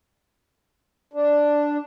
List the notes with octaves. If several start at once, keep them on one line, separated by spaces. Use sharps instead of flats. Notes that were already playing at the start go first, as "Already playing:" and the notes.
D4